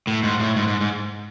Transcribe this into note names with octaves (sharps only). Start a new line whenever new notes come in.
A2
G#2
A2
G#2
G#2
G#2